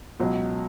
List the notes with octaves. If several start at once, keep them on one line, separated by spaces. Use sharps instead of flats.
C#2 B2 F#3